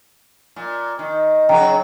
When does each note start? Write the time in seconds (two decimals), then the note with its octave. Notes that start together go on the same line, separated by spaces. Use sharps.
0.56 A#2
0.99 D#3
1.49 C#3 F#3 F#4 G5 A#5